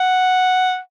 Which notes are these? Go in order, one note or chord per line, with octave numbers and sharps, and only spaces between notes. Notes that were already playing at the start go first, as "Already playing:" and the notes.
Already playing: F#5